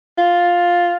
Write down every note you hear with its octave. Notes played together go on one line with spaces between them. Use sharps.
F4